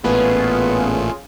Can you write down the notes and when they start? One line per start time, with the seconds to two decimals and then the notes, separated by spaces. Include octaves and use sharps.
0.04 A1 A#2 A3 B3 C#4 F4 G#4 B4